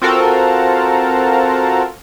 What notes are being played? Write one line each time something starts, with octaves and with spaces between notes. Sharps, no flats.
C4 F4 F#4 A4 A#4